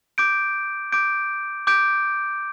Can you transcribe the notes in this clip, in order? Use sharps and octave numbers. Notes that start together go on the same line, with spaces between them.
D6 G6 D7
D6 G6 D7
D6 G6 D7